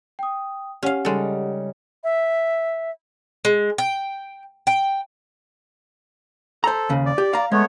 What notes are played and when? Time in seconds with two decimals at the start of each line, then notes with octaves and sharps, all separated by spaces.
0.19 G5 D#6
0.83 C#4 G4 F5 F#5
1.05 C#3 G3 G#3 D#4 A4
2.04 E5
3.45 G#3
3.78 G5
4.67 G5
6.64 A4 C5 A#5
6.89 D#2 C#3
7.06 D5
7.18 G4
7.33 F5 A#5
7.52 G#3 A3 B3 C#5